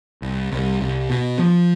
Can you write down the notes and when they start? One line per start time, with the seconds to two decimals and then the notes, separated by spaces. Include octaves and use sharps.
0.22 C2
0.52 C2
0.81 C2
1.10 B2
1.39 F3